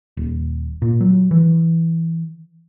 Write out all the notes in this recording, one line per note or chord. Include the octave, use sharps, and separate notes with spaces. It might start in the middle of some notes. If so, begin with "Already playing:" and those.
D#1
A#2
F#3
E3